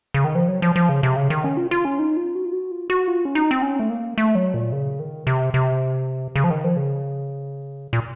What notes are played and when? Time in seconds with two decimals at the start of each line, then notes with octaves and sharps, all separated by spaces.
0.14 C#3
0.24 D#3
0.35 F3
0.48 F#3
0.62 F3
0.76 F3
0.89 C#3
1.03 C3
1.16 C#3
1.30 D#3
1.44 C#4
1.57 F4
1.71 F4
1.85 C#4
1.99 D#4
2.17 F4
2.35 F#4
2.45 F4
2.53 F#4
2.71 F4
2.90 F#4
3.08 F4
3.25 C#4
3.35 D#4
3.51 C4
3.62 C#4
3.80 A3
3.90 A#3
4.18 A3
4.35 F#3
4.54 A#2
4.72 C#3
5.00 D#3
5.27 C3
5.54 C3
6.36 C#3
6.44 F3
6.50 D#3
6.64 F3
6.77 C#3
7.93 A#2